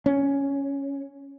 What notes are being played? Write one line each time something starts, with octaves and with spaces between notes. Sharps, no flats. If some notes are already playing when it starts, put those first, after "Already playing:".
C#4